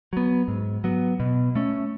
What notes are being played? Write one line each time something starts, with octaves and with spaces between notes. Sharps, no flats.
F#3 B3
G#2
F#3 B3
B2
A3 C#4